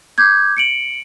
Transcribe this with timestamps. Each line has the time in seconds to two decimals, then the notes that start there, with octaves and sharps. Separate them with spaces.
0.18 D6 G6 G#6
0.57 C#7 D7 F#7